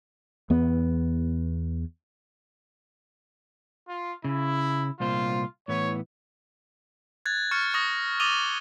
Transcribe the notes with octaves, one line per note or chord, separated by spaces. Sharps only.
E2 B3
F4
C#3 E4
C2 A#2 F4 C5
A2 E3 B3 C#5
F#6 G#6 A6
C#6 F6 A6 C#7
C#6 D#6 A#6
D6 D#6 A6 D#7 F7 G7